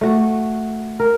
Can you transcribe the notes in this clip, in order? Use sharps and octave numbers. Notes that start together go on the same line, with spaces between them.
A3 F#4
A#4